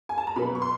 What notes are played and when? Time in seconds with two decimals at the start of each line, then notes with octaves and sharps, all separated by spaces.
0.09 G#5
0.18 A5
0.27 A#5
0.36 B2 F#3 B3 B5
0.55 C#6
0.62 C6